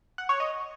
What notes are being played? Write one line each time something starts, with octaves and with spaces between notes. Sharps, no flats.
F#5
C#5
D#5